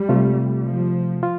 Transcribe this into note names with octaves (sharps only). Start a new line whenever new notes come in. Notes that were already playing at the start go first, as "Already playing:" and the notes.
Already playing: G3
C3 A3 F4
F3
F4